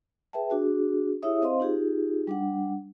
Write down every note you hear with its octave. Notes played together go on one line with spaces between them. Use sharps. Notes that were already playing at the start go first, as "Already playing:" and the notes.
G#4 B4 E5 G5 A5
D4 F#4 G#4
E4 G4 G#4 C#5 E5 D#6
C4 C5 D#5 F5 C6
D#4 F4 G4 G#4
G3 D4 F#5